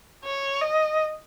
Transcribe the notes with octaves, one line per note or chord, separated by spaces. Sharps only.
C#5
D#5